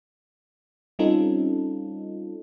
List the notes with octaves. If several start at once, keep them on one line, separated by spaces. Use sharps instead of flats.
G3 C4 C#4 D#4 F4 A4